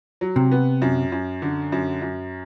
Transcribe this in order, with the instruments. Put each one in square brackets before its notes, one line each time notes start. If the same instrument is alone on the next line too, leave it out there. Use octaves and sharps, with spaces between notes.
[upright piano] F#3
[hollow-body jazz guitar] C3
[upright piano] B3
F#2
F#2
D3
F#2
F#2